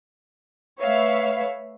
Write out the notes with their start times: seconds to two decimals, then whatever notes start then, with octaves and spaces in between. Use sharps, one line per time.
0.81 A3 B4 C#5 E5 F5